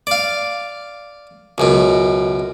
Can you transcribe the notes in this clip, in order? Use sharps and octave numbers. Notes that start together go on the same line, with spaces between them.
D5 F5
C#2 F#2 B2